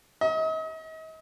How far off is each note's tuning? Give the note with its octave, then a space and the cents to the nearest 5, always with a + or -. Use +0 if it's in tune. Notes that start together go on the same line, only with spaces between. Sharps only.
D#5 +40